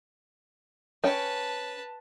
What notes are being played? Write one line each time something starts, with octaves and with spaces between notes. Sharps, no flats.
C#4 B4 G5 A5